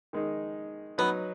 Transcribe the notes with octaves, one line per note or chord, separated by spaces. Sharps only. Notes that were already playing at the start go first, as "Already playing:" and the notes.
D#3 G#3 D#4
F#3 B3 D#4 B4